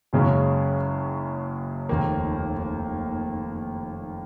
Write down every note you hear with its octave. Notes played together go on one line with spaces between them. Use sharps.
F#1 F#2 C#3 G#3 C#4
F1 D#2 D#3 A#3